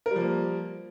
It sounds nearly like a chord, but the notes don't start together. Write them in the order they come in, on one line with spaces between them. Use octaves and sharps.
A#4 G3 F3 A#3